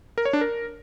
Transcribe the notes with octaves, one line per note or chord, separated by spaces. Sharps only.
A#4
C#5
D4
A#4